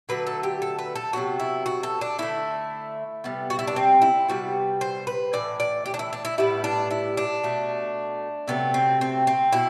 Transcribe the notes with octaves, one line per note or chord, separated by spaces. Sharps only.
D3 F#3 A3 B4
A4
G4
A4
B4
A4
C3 F#3 B3 F#4
E4
F#4
A4
D4
D3 A3 E4
C3 G3 B3
F#4
E4
D4
C4
E4
C3 G3 B3 F#4
C5
B4
A2 E3 D5
D5
G4
D4
E4
D4
E4
A2 G3 B3 E4
D4
E4
D4
B2 A3
C3 F#3 A3 B3
C4
C4
C4
B2 E4